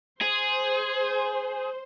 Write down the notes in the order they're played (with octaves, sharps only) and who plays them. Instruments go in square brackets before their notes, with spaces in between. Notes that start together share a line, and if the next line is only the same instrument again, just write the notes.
[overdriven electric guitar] G#4 [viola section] C5